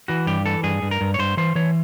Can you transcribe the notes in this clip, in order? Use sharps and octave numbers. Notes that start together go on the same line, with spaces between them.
E3 F#4
G2 G4
E3 A4
G2 G#4
G2
A#4
G2
C#5
G2 C5
E3 C5
E3 C#5